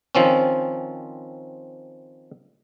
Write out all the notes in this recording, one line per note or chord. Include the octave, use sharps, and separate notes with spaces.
D#3 F3 C4 C#4